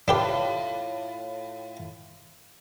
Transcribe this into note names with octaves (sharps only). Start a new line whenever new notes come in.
A2 D4 F4 G4 B4